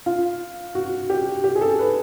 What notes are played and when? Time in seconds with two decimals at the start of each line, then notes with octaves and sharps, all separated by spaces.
0.06 F4
0.75 F#4
1.10 G4
1.44 G4
1.55 G#4
1.61 A4
1.79 B4